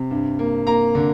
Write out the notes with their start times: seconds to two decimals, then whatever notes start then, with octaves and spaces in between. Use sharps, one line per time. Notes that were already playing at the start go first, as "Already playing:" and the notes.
Already playing: C3
0.11 G2
0.39 A#3
0.67 A#3 A#5
0.95 D3